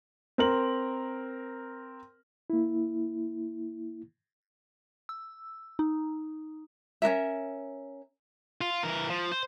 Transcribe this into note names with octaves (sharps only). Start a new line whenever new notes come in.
C4 A#4 F#7
A#3 E4
E6
D#4
C#4 D4 A#4 E5
F4
E3 A#4
F3
C5